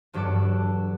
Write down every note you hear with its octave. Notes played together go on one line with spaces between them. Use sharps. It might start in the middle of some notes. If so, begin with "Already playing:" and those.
E1 G2 F#3 A4 F#5 D6